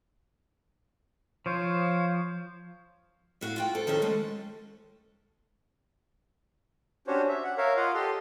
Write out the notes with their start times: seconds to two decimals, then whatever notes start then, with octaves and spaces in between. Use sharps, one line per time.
1.46 F3 C5 C#5 F5
3.41 A2 F#4 F5
3.56 F4 F#4 G5
3.75 A4 C5
3.87 D#3 F3 C#4 A4
4.02 G#3 A3
7.07 C#4 D4 F#4 G4 C5 C#5
7.29 E5
7.44 F#5
7.58 A#4 C#5 E5 F5
7.77 F4 D#5 F5 F#5
7.94 G4 A4 D#5 C6